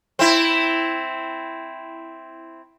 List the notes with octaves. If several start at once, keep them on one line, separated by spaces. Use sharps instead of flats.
C4 E4